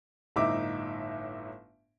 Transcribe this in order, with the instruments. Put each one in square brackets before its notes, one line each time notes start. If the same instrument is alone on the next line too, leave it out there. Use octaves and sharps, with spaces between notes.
[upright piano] G1 A2 D#4 E5 D6